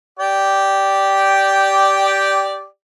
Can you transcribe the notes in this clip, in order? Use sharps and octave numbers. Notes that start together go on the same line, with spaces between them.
G4 D5 G5